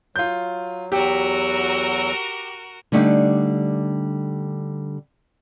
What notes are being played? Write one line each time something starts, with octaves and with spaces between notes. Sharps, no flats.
F#3 F4 G6
E2 F#3 F#4 G4 A#4 E6
D3 G3 A3 D4 D#4 G4